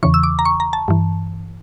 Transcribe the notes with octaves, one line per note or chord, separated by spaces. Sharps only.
E2 C#3 E3 C#6
E6
D6
A#5
C#6
A#5
A5
G2 E3